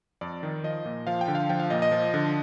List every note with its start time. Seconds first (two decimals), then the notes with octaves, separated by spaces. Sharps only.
0.21 F2 D5
0.43 D#3
0.64 F3 D#5
0.85 A#2
1.07 F3 F5
1.21 G5
1.28 D3
1.35 F5
1.49 F3 G5
1.60 F5
1.70 A#2 D#5
1.82 D#5
1.92 F3
2.14 D3